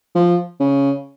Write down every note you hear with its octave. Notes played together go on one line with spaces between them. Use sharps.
F3
C#3